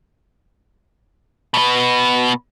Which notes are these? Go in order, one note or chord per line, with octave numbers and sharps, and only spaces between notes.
B2 B3